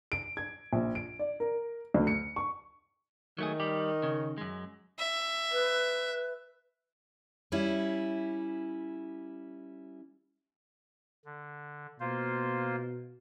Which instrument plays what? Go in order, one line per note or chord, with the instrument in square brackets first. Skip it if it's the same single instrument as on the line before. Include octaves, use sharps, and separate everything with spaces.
[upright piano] D7
G#6
A#1
D7
D5
A#4
D2
C#7
C#6
[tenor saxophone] D#3 [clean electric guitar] F#3 A3 G#4
[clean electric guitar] G3 G4
C#3
F#2 G#3
[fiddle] E5
[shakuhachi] B4
[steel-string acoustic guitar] G3 C#4 E4
[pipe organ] D3
[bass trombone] B2 [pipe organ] A#3 F4 C5